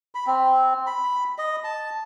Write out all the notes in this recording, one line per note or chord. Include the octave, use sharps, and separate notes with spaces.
B5
C4
B5
D#5
A5